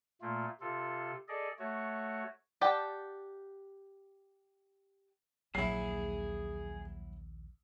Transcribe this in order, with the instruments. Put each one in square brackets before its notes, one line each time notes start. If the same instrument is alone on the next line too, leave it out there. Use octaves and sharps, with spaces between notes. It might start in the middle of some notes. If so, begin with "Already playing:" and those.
[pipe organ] A#2 A3 A#3 F4
C3 F4 A4
G#4 A4 D5 D#5
A3 F#4 C#5
[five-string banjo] G4 D5 F#5 G5 A5
[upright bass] A#1 D#2 [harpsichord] F#3 E4 [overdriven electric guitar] G#4 [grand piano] C7